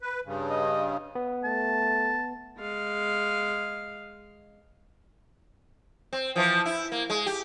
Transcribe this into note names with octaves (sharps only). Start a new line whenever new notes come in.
B4
G2 C#3
D#5
B3
A3 A5
G#3 F5
C4
E3 F3
E4
A#3
G#3
G4